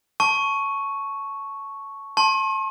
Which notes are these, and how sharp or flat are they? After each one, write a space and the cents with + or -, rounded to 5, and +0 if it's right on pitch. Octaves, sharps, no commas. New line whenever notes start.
A5 +0 C#6 +0
A5 +0 C6 +45